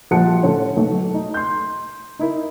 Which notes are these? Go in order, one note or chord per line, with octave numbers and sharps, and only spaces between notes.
A#1 F3 G3 F#5 A5 C#7
A2 D3 C#4 C#5
B1 B2 A3
A3 D#4
C6 G6
D#4 E4 A#4